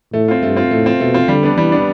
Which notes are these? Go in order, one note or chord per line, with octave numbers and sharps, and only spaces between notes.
A2 A3
C4 F4
G2 A3
C4 F4
A2 A3
C4 F4
B2 A3
C4 F4
D3 G3
B3 D4
E3 G3
B3 D4